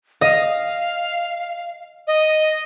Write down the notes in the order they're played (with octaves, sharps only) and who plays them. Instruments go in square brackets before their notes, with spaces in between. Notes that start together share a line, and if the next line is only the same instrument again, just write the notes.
[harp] D#5 [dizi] F5
[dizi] D#5